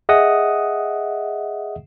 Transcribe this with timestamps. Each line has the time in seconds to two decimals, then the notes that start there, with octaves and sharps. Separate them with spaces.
0.09 G#4 D#5 E5 F#5 D#6